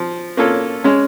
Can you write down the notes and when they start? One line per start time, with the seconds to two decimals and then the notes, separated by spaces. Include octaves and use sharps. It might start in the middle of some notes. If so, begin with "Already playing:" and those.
Already playing: F3
0.37 A#3 C#4 F4 A4
0.84 G#3 C#4